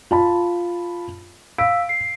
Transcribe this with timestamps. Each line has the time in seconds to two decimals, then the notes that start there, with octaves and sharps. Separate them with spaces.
0.11 F4 A5 B5
1.58 F5 E6 B6 D7
1.89 C7